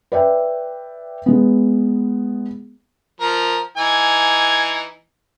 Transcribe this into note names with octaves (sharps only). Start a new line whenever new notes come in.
B4 D5 E5 G5
G#3 B3
F3 A#4
E3 D#4 G#5